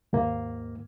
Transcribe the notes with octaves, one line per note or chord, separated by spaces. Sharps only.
D#2 G#2 A#3